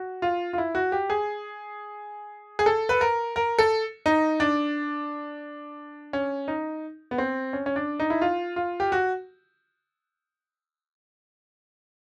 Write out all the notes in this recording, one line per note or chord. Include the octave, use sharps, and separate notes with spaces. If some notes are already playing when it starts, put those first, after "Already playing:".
Already playing: F#4
F4
F4
E4
F#4
G4
G#4
G#4
A4
B4
A#4
A#4
A4
D#4
D4
C#4
D#4
B3
C4
C#4
C#4
D4
D#4
E4
F4
F4
G4
F#4